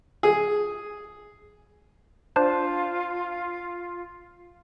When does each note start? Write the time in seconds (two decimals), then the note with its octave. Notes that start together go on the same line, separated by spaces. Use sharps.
0.23 G#4
2.36 D4 F4 C5 A5